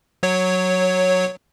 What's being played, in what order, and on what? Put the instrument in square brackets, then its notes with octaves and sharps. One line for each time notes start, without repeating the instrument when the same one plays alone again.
[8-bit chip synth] F#3 C#5